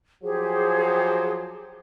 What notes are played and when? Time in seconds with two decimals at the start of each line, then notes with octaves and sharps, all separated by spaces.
0.24 F3 F#3 G4 G#4 C5